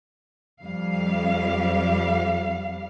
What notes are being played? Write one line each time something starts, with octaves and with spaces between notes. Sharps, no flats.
F2 G3 F5